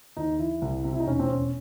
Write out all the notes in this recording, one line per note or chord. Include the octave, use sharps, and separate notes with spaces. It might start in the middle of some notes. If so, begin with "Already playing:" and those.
D#2 D#4
E3 E4
C2
C3
E4
D#4
E1 C#4
C4
E1 C#4